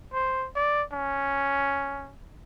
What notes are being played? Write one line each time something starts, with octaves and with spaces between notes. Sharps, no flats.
C5
D5
C#4